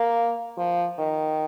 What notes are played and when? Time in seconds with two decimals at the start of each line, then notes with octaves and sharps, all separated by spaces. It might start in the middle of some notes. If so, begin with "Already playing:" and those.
Already playing: A#3
0.58 F3
0.99 D#3